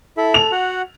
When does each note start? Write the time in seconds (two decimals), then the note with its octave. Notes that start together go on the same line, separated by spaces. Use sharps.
0.17 E4 A4 E5
0.34 A4 F7
0.52 F#4 F#5